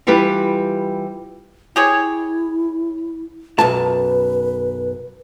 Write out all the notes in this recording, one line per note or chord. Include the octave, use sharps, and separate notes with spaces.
E3 G3 F4 G4 B4
E4 G4 G#4 C#5
B1 F#2 B4 A5